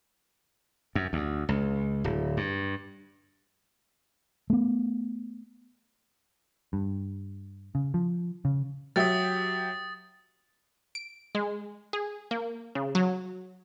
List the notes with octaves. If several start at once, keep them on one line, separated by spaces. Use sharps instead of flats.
F#2
D2
C#2
D1
G2
A3 B3
G2
C#3
F3
C#3
F#3 G4 E5 D#6 A6
D7
G#3
G#4
A#3
C#3
F#3